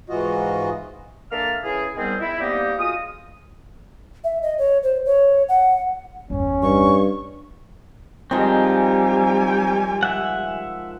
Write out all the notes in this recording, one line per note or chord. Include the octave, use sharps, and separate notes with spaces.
G#2 E3 F4 F#4 D#5
D3 A#3 A4 E5 A5 F6
C#3 E3 E4 G#4
G#2 D#3 G3 B3 C4 G#4
E4
C3 G3 A#3 B3 D#4 G4
G#3 F4 F#4 D#6
E5
D#5
C#5
C5
C#5
F#5
G1 E2 C#4
G2 C#6
D#3 F3 G3 G#3 C4 D#4 G#5
E5 F#5